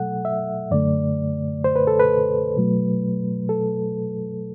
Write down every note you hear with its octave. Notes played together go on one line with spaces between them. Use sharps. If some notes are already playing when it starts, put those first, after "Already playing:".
Already playing: B2 F#3 A3 A4 F#5
E5
F#2 D3 A3 D5
C5
B4
A4
B4
B2 F#3 A3
A4